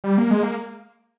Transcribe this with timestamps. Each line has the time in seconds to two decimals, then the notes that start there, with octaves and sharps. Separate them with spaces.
0.04 G3
0.18 A#3
0.31 G#3
0.43 A#3